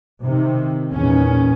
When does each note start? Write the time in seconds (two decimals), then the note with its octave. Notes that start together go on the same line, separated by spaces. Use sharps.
0.25 C3 D#3
0.93 E2 A#2 D#3 C#4